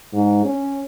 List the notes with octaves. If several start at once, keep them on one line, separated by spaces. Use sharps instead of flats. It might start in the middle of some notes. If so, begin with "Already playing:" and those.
G#2
C#4